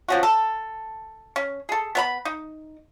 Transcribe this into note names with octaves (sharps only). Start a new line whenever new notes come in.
F3 C#4 F#4
A4
C#4
G#4 A4
B3 C#5 B5
D#4